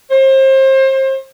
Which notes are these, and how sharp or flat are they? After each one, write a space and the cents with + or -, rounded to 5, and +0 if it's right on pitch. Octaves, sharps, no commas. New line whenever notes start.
C5 +30